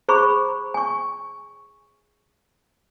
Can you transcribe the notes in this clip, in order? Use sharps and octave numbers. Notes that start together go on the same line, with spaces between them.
G#4 C5 A#5 B5 C#6
G#5 C#6